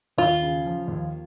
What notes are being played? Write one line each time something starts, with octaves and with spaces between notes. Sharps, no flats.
D#2 F4
C#3
F3
D#2